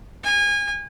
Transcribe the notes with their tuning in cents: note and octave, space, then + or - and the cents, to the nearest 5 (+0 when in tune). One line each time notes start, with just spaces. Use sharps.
G#5 -30